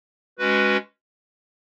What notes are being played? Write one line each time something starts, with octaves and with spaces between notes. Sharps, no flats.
G#3 C#4 F#4 B4